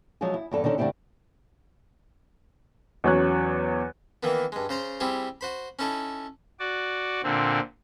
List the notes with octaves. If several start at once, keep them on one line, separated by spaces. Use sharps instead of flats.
F3 F#3 G#3 F4 G#4
E4
E2 G2 A4
D3 D#3 C#4 A4
G2 D3 A3 C4 E4 G4
E2 F#3 C#4 C#5 F#6
D#3 E3 A#3 B3
G2 G#3
C#3 C5 A#5 C6
G3 C4 E4 G4 G#4
F#4 C5 B5
C#4 D#4 E4 A4
F#4 D5
A#2 D3 C4